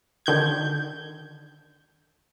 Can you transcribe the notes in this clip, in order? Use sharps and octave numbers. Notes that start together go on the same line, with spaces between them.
D3 D#3 G6 G#6